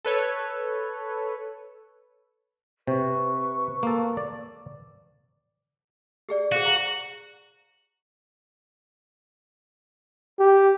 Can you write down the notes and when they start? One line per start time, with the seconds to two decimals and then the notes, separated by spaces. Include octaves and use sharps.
0.05 A4 B4 C#5
2.87 C3 B4 C#6
3.83 A#3 A4
4.17 D5
6.29 G4 G#4 D5
6.52 F#4 G#4 C5 F5
6.66 A#5
10.39 G4